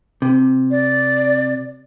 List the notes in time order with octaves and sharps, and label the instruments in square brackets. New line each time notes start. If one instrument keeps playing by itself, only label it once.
[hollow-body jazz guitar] C3
[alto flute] D5